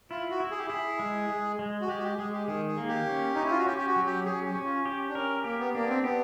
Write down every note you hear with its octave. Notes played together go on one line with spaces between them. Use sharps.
E4 F4
F#4
E4
G#4
G4
E4 G#4
G#3
G#3
G#3
F#4
G#3 G4
F#4
G4
G#3 G#4
G4
D#3 G#4
G#4
A#3
G4
C#4
C#4 D#4
E4
F4
F#4
C#4 G4
G4
F#4
F#3
G4
C#4 G#4
G4
C#4
F4
G4
D4
C#4 A#4
A#3 G4
B3
A#3 D4
B3
C4
B3 G4